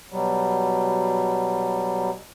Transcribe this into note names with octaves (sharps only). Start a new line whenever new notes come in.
B2 F#3 G3